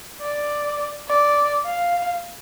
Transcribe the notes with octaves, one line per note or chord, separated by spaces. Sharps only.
D5
D5
F5